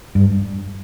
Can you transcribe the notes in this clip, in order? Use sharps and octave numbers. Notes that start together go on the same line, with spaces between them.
G2